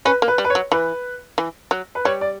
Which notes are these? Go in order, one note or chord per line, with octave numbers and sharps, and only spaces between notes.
C#4 B4
A#3
B4
G3
B4
C#5
F#3
E3 B4
E3
F#3
B4
G3 C#5
D5